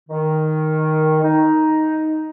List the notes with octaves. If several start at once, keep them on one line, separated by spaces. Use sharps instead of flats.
D#3
D#4